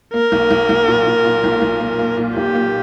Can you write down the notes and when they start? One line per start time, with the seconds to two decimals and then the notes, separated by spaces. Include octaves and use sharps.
0.14 A#3 A#4
0.32 B1
0.51 B1
0.69 B1
0.88 A#2
1.06 A#2
1.25 A#2
1.44 B1
1.62 B1
1.80 A#3
1.99 A#3
2.17 A#2
2.36 B1 G4
2.55 A#3